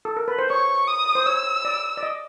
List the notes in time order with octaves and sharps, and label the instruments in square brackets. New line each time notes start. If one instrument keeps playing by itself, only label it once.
[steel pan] A4
A#4
B4
C5
[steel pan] C#5 [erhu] C#6
[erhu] D#6
[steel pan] C5
[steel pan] C#5 [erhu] E6
[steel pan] D5
D5
D#5